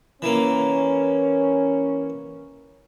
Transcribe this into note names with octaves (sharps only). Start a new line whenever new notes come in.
E3 A#3 C#4